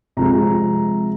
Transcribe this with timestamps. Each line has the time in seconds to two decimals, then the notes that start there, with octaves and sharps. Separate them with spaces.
0.17 C3 F3 G#3 A#5